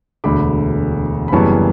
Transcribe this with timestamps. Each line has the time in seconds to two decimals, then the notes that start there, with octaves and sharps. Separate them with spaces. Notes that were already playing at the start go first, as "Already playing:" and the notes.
0.24 E1 D2 D3 B5 D6
1.28 B5
1.32 F#1 F#2 E3 G3 B3 A5 C#6